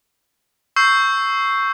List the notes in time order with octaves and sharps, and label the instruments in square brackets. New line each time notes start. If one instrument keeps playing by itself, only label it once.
[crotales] C#6 E6 G6 C7